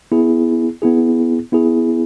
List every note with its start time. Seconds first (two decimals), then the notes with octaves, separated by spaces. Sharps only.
0.12 B3 E4 G#4
0.82 B3 E4 G#4
1.52 B3 E4 G#4